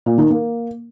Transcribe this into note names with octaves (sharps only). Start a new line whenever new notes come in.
A#2
D#3
A#3